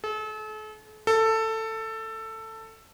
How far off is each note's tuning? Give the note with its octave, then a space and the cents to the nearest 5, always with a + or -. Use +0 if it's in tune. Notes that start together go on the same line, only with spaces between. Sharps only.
A4 -40
A4 +15